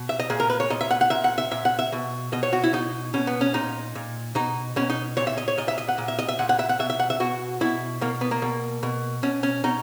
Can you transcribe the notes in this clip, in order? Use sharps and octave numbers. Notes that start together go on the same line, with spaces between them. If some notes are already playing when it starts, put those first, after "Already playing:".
Already playing: B2
E5
D#5
A#2 G#4
A#4
B4
C#5
A#2 D#5
E5
F#5
F#5
A#2 E5
F#5
E5
A#2 E5
F#5
E5
B2
B2 D#5
C#5
F#4
E4
B2 D#4
B2 C#4
B3
C#4
A#2 D#4
A#2
B2 D#4
B2 C#4
D#4
A#2 C#5
E5
D#5
C#5
A#2 D#5
E5
D#5
F#5
A#2
E5
D#5
E5
A#2 F#5
F#5
E5
F#5
B2 E5
E5
F#5
E5
B2 F#4
B2 E4
B2 A#3
B3
A#3
B2
B2
B2 C#4
C#4
B2 D#4